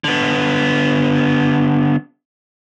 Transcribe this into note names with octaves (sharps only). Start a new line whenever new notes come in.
D3 B3